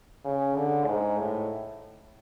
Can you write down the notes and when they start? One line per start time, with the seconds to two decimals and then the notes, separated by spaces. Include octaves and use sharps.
0.25 C#3
0.56 D3
0.86 G#2
1.17 A2